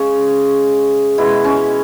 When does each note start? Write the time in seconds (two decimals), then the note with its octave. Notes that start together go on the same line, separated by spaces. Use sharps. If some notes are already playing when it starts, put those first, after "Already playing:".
Already playing: C#3 G#3 C#4
1.18 B2 G#3 E4
1.44 C#4